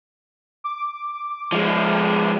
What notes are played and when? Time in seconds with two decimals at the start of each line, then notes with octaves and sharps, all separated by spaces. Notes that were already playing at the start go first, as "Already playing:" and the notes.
0.64 D6
1.52 F3 G#3